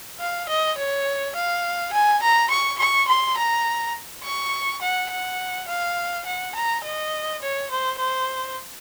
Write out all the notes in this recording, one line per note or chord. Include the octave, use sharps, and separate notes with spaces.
F5
D#5
C#5
F5
G#5
A#5
C#6
C#6
C6
A#5
C#6
F#5
F#5
F5
F#5
A#5
D#5
C#5
C5
C5